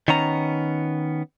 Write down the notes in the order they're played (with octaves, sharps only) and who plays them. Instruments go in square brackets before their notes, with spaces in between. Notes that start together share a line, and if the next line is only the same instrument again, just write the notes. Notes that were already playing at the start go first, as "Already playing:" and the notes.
[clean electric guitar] D#3 B3 C#4 A#5